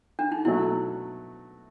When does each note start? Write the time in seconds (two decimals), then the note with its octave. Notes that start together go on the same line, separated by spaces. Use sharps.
0.19 D4
0.32 D#4
0.45 B2 F#3 A3 E4